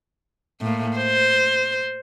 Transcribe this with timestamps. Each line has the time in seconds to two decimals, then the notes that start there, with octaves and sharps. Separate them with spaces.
0.61 A2 A#3
0.97 C5